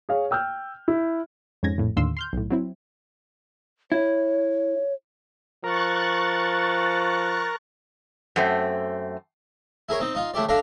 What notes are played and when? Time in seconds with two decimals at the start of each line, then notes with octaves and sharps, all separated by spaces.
0.09 G#4 C#5 F5
0.31 G5 E6 F6 G6
0.88 E4
1.63 F2 G#2 C#4 G#6 A#6
1.78 A#1 F2 A2
1.97 D#2 A2 D3 F5 C6 E6
2.17 C6 F6 G6
2.33 B1 A2
2.50 F#3 C4 E4
3.92 E4 C#5
5.64 F3 A#4 C#6 F#6 A6
8.36 F#2 A3 C4
9.89 E4 G#4 A#4 C#5
10.00 C4 D#4
10.15 D#4 F4
10.34 C#3 A3 E4 G4 D5
10.49 D4 A4 D5 E5 F5 A#5